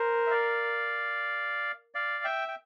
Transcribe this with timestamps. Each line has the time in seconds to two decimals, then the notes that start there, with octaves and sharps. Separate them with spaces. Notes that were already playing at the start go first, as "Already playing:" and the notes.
Already playing: A#4 C5
0.27 E5
0.31 D5 F5
1.95 D5 F5
2.24 E5 G5
2.48 G5